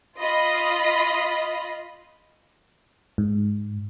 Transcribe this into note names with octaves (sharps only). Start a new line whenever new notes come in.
F4 D#5 B5
G#2